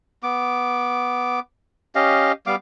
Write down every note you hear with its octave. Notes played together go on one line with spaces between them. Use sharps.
B3 D6
C#4 G4 D#5 F5
G3 B3 F5 D6